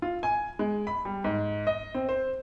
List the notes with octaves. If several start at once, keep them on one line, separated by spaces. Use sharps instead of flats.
F4
G#5
G#3
B5
G3
G#2
D#5
C4
C5